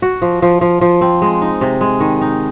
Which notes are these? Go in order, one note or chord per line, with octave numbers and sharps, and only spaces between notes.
F#4
F3
F3
F3
F3
C4
G#3
D#4
C3
G#3
D#3
D#4